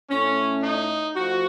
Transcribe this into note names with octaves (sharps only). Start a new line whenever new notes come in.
A2 A3 C#4
D#4
F3 A3 F#4